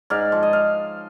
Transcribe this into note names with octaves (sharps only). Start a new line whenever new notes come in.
G#2 D5 F5
F3
D#5
F5